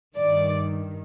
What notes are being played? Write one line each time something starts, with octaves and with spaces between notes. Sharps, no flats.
G2 D#3 D5